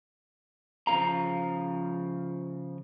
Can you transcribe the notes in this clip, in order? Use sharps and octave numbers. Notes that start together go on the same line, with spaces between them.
C#3 F3 D#4 A4 F5 A#5